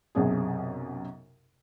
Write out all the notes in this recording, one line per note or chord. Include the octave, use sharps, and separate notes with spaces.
B1 F#2 C3 G#4